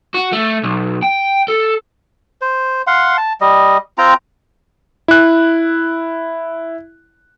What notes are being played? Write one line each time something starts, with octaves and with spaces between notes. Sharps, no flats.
F#4
A3
B1
G5
A4
C5
F5 F#5 C6
A5
G3 D#5
C4 F4 G5 A#5
E4 F#6